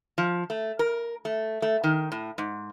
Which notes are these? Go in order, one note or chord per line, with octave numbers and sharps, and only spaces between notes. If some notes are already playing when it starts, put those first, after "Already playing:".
F3
A3
A#4
A3
A3
D#3
A2
G#2